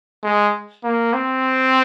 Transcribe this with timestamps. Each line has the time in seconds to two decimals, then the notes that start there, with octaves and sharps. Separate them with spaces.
0.23 G#3
0.84 A#3
1.14 C4